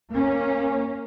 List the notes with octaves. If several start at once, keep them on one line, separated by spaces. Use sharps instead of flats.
A#3 C#4